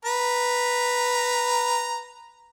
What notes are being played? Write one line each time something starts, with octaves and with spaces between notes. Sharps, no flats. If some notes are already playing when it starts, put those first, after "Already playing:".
B4 A#5